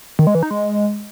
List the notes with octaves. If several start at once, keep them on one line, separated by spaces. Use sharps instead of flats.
D#3
G#3
E3
D#4
G#3